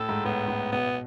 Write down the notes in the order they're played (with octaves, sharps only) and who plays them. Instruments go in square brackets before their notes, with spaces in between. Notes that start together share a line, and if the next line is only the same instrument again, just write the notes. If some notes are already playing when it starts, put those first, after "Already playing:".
Already playing: [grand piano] A2 [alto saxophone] A4
[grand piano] G#2
[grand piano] A2 [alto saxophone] B3
[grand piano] A2
[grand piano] B2 [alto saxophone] B3